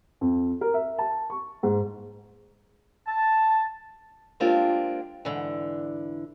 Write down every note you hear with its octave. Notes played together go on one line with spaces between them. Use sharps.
F2
A#4
E5
A5
C#6
G#2
A5
G#3 A#3 C4 D4 F4 G4
G#2 D3 E3